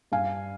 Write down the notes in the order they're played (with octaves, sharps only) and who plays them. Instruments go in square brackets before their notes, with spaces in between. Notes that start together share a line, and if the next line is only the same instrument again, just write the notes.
[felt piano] G2 F5 G#5